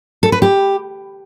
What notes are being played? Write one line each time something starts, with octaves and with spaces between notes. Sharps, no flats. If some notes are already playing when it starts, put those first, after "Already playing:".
A4
B4
G4